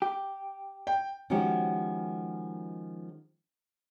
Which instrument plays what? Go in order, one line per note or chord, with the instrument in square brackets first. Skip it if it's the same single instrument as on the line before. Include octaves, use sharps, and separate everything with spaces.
[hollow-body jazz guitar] G4
[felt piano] G5
[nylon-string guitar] D#3 F3 G#3 C#4 F#4 G4